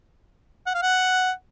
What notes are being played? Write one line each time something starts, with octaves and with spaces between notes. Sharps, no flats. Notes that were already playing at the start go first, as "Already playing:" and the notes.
F#5
F5
F#5